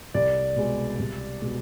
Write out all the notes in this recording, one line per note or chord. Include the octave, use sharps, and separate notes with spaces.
C2 D5
B2 G#3
C2
B2 G#3